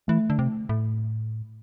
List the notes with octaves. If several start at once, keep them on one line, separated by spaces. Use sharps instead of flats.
E3 A3
D3
C3
A2